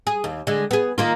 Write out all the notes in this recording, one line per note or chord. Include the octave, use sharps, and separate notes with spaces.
G#4
D#2
D3 G#3
B3 G#4
D#3 A#3 F4